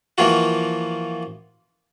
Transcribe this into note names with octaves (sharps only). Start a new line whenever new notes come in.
E3 F3 A#3 F4 F#4